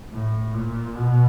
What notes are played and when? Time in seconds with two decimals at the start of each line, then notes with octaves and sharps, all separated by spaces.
0.13 A2
0.54 A#2
0.95 B2